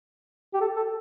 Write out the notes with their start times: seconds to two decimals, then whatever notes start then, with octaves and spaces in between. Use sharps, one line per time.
0.54 G4
0.61 A4
0.77 A4